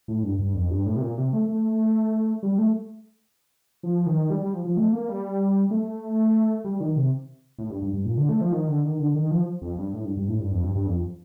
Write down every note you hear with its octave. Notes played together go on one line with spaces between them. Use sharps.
A2
G2
G2
F2
G2
A2
C3
A#2
C3
A3
A3
G3
A3
F3
D#3
G3
G3
F3
F3
A3
A#3
G3
A3
G3
D#3
C3
A2
G2
G2
G2
A#2
D3
A3
F3
D#3
D3
D#3
D3
D#3
F3
F2
G2
A2
G2
G2
A2
G2
F2
G2
G2
F2